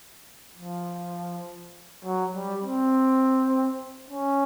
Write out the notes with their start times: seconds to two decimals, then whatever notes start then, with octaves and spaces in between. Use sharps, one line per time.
0.58 F3
2.04 F#3
2.34 G3
2.64 C4
4.10 C#4